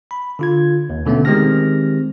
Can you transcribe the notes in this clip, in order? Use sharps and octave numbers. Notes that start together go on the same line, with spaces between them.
B5
D3 F4 G#6
D#2
B2 D3 A3 B3 C#4
D#3 G#3 C4 G4 F6 A#6